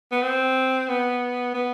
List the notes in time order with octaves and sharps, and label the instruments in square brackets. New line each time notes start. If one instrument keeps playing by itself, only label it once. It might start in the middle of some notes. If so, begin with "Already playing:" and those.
[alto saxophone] B3
C4
B3
B3